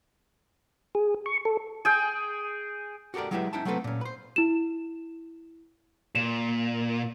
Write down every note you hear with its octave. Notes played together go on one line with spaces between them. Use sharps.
G#4
C#6
A4
G#4 G5
F#4 G4 A4 A#4 D5
F#3 G#3 E4 G4 B4 E5
C#4 D#4 E4 G5 A5
F#3 A3 A#3 C4 A4 B4
A#2 C#4
B4 C5
E4 E7
A#2 E7